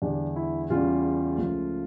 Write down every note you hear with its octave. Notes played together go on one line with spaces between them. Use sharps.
E2 D3 G3 D4
E4
E2 C#3 G3 F4
C#2 C#3 F3 A3